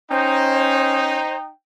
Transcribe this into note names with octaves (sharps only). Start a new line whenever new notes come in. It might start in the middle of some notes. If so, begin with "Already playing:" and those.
C#4 D#4 C5 G5